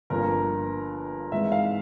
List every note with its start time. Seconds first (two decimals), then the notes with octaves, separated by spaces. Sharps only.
0.10 G1 G2 F3 A#3 A#4
1.32 G#1 G#2 E3 G#3 E5
1.52 F5